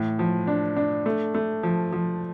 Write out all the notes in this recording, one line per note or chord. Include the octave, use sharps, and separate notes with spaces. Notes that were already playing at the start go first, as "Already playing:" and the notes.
Already playing: A2 E3
F3
D4
D4
A3
A3
F3
F3